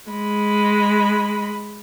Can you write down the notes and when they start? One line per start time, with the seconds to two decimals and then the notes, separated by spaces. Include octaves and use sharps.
0.10 G#3 B5